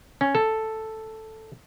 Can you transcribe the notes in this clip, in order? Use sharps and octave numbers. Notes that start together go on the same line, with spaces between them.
C#4
A4